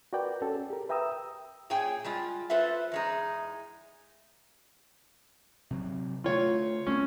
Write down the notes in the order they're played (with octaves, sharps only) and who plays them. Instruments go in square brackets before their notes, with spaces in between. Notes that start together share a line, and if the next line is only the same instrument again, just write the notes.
[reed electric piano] F#4 A#4 B4 D5 G5
C#4 A4
G#4
G4 A#4
B4 E5 G5 A#5 D#6 E6
[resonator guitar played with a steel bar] A#2 G#4 C#5 G5 G#5
G3 G#3 F4
F4 A4 B4 C5 E5 F5
E2 G#3 D#4
[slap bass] C3 F#3
[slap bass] D3 A3 [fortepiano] F4 C#5
[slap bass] G2 A3 C4 [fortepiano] C#4